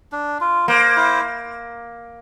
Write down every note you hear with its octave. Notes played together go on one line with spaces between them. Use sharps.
D4
F4
A#3 C5
E4